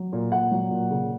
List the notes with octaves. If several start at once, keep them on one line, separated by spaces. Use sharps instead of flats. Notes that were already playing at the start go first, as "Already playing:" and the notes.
Already playing: F#3
A#2
A#2 F#5
F#3
A#2
C#3